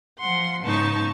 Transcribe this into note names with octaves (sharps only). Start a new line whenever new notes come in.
F3 F#5 C6
G#2 C#3 B3 D#4 A5 C#6